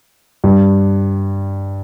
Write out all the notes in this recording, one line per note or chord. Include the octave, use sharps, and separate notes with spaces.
G2